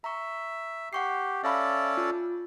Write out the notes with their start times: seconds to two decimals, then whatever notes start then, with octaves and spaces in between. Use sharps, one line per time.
0.04 E5 A#5 C#6
0.93 G4 F#5 C#6 C7
1.44 C#4 A4 D5 E5 F5 B5
1.97 F4